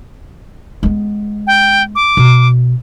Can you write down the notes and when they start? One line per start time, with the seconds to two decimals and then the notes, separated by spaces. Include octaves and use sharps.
0.83 G#3 B3
1.47 G5
1.95 D6
2.17 B2